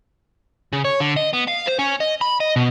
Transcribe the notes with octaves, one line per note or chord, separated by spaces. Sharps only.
C#3
C#5
D3
D#5
B3
F5
C5
C#4
D#5
B5
D#5
B2